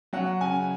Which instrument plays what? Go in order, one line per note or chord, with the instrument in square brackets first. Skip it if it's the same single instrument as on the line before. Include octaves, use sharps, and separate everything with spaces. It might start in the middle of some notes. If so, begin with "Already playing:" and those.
[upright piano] F#3 F#5
C#3 G#5